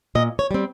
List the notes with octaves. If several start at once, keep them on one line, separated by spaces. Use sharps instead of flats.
A#2 D#5
C#5
G3 C4